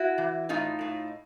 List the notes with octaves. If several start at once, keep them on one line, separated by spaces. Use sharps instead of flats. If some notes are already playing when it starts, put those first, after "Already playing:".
Already playing: E4 F#4
E3
A2 D#4 F4
A2